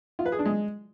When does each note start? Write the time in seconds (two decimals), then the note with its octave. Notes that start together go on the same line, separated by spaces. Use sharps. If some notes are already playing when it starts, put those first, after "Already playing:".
0.19 F4
0.26 B4
0.32 G#4
0.39 D4
0.46 G#3